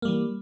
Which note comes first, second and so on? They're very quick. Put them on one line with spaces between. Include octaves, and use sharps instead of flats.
A#3 G3 E3